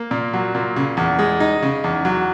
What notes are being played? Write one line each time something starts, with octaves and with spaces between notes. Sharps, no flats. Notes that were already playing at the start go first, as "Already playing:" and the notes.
Already playing: A#3
A#2
F#3
A#2
C#3
E2
G#3
D#4
C#3
E2
F#3